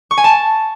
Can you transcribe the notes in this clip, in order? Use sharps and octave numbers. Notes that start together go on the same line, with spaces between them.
C#6
G#5
A5